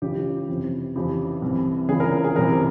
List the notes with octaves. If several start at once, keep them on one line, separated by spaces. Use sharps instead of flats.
C#2 C#3 E3 G4
F2 C3 E3
F2 C#3 E3 G4
C2 C3 E3
C#2 C#3 E3 G#4
A#4
A#4
G#4
C2 C3 E3 A#4